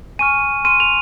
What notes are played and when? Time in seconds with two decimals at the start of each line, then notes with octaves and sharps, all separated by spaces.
0.19 G#5 C#6 F6 D#7
0.65 C6 F6 D#7
0.80 F7